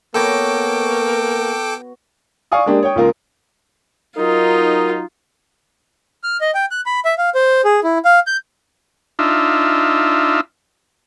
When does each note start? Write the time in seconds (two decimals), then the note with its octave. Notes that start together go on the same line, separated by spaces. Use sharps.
0.14 A#3 B3 F#4 A4 C#5 G5 D6
2.52 D5 F5 G#5 C#6 D#6
2.66 G#3 A#3 D4 G4
2.83 C#5 G5
2.95 C#2 A#3 F4 A#4
4.17 F#3 D#4 F4 A#4
6.24 F6
6.41 D#5
6.55 G5
6.71 F#6
6.86 B5
7.05 E5
7.18 F5
7.35 C5
7.65 G#4
7.84 E4
8.05 F5
8.27 G6
9.19 D4 D#4 F4 E5